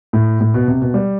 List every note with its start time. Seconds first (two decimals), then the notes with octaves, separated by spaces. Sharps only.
0.13 A2
0.41 A2
0.54 B2
0.68 C3
0.81 B2
0.94 G3